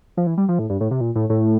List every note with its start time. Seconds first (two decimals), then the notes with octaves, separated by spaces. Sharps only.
0.17 F3
0.27 E3
0.38 G3
0.49 F3
0.59 A2
0.70 G2
0.81 A2
0.91 C3
1.01 A#2
1.15 A2
1.30 A2